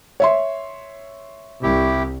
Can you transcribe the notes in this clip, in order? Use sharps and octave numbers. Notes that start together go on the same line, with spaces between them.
C#5 E5 C6
C2 E4 G4